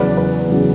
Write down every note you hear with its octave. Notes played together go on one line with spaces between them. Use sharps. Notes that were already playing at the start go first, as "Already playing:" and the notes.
Already playing: E2 C#3 F#3 B4 D5
B4 D5
E2 C#3 F#3